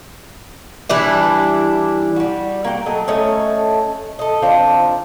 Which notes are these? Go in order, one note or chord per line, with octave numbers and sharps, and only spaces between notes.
E3 G3 D4 E4
G3 F#4
A#3 F#4 F5 G5
F#3 A3 D#5
A3 C#4 C#5 D#5
A4 D#5
D#3 C4 D4 F4